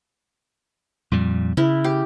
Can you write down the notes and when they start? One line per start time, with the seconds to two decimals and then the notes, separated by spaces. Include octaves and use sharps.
1.11 F2 A#2 G3
1.57 C#3 E4
1.84 G4